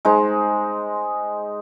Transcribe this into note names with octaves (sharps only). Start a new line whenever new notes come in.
G#3 D#4 C5